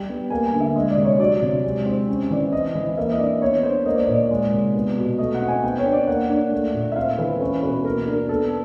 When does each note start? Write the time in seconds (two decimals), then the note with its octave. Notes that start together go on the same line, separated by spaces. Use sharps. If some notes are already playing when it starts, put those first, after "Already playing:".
Already playing: G3 G5
0.09 B3
0.30 A#3 G#5
0.46 G#5
0.53 D3
0.60 E5
0.76 G#3 D#5
0.90 D5
0.97 C3
1.04 C#5
1.20 F#3 D5
1.42 C3
1.64 G#3
1.86 C4
2.08 C#4
2.31 E3 D5
2.52 C4 D#5
2.75 E3
2.98 A#3 E5
3.12 D#5
3.19 D4 D5
3.41 B3 C#5
3.63 D4 C5
3.86 A#3 D#5
3.95 D5
4.03 C#5
4.08 A#2 D5
4.31 G#3
4.53 C3
4.74 B3
4.98 B2
5.19 A3 D#5
5.35 F#5
5.42 C4
5.48 G#5
5.63 B3 G5
5.78 C#5
5.85 D4
5.92 D5
6.07 A#3 F#5
6.30 D4
6.52 A3
6.74 A#2
6.92 E5
6.96 C4 F5
7.18 E3 B4
7.40 C#4 B4
7.63 B2 B4
7.85 A#3 A#4
8.08 D4 A#4
8.29 B3 A4